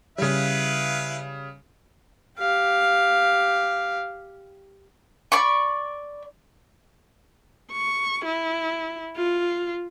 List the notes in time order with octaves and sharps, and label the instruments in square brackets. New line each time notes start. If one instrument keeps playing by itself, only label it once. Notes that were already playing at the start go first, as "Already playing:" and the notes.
[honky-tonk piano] C#3 G3 [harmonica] E4 B4 F5
[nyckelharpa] G4 F5
[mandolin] D5 B5 C#6
[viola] C#6
E4
F4